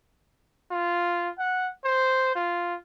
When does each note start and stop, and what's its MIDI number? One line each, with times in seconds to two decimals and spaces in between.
0.71 1.30 65
1.39 1.69 78
1.85 2.32 72
2.36 2.75 65